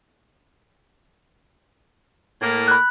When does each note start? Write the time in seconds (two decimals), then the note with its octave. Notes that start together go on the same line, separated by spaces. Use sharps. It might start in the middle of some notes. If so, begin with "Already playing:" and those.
2.41 A2 A#3
2.68 B5 F#6